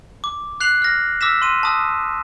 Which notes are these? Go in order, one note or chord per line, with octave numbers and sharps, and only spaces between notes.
D6
F#6 C7 F7 F#7
F6 A#6
D6 E6 F6 A#6 B6 E7
C6 D#7
A5 D#6 E6